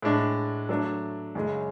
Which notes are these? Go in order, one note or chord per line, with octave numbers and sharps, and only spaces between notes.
A2 G#3 D4
F#3 A3 D4
F#2 C#3 G#3